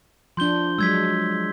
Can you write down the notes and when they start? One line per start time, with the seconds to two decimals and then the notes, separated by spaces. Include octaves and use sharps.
0.37 F3 D4 C6 G6 G7
0.78 F#3 G#3 E6 G#6 B6